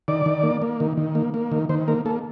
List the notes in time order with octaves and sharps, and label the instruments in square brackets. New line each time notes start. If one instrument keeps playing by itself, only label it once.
[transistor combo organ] D#3 D5
D#3
A#3
A#3
D#3
D#3
A#3
A#3
D#3
D#3 C5
A#3 A#4
A#3 A4